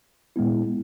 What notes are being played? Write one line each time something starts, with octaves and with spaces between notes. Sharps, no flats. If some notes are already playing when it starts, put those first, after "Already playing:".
A#2 G#3 B3 E4